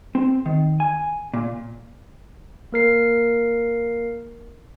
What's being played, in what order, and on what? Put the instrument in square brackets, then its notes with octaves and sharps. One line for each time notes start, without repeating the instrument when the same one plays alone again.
[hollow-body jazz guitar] C4
D#3
G#5
A#2
[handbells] A#3 A#4 C7